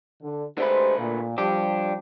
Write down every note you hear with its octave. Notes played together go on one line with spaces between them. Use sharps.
D3
D3 G#3 A3 G4 B4 C5
A#2
F3 G3 D4 G4